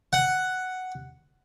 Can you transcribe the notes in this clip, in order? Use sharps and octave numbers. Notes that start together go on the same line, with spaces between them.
F#5